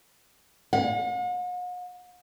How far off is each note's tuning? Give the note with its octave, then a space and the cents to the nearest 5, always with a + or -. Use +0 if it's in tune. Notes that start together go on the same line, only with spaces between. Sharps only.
F#5 -45